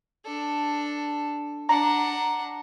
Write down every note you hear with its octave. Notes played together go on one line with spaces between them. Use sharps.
D4 A4
D4 F#5 A#5